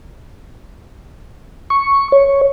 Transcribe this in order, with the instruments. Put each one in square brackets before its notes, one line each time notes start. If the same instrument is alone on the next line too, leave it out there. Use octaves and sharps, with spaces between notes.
[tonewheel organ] C#6
C#5